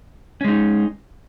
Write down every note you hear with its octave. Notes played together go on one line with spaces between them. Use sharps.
G#3 C#4 D#4